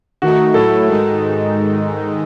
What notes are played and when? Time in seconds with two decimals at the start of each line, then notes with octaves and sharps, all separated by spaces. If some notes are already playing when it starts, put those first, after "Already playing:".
0.22 D#3 A3 D#4 F#4
0.54 A2 F#3 A3 E4 A4
0.87 G#2 D#3 G#3 D#4